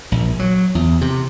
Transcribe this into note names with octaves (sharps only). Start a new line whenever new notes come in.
A#1
F#3
E2
C3